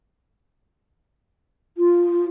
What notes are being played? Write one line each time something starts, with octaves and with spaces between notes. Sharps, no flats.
F4